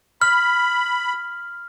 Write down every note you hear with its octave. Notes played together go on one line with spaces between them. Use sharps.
B5 F6